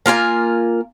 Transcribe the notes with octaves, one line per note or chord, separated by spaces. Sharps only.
A#3 F4 A#4 G#5